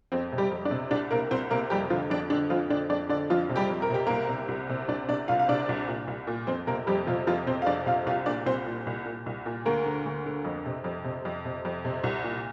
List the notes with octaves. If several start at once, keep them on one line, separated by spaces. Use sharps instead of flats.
F2 C4
C3
G3 G4
F2
D4 D5
C3
C2 D4 D5
C3 A#3 A#4
C2 C4 C5
C3 A#3 A#4
F2 G3 G4
D3 F3 F4
F2 D4
D3 D4
F2 F3 F4
D3 D4 D5
F2 D4 D5
D3 D4 D5
F2 F3 F4
C3
G3 G4
F2
A#4
C3 G4
C2 A#3 A#4
C3
C2
C3
C2 D4 D5
C3 D4 D5
C2 F4 F5
F5
C3 D4 D5
C2
A#2
C2
A#2
F2 C4 C5
C3 A#3 A#4
F2 G3 G4
C3 F3 F4
F2 F3 F4
C3 C4 C5
F5
F2 D4 D5
C3 F4 F5
C2 F4 F5
A#2 D4 D5
C2 C4 C5
A#2
C2
A#2
C2
A#2
D2 A#3 A#4
D3
D2
D3
F2
C3
F2
C3
F2
C3
F2
C3
C2
A#2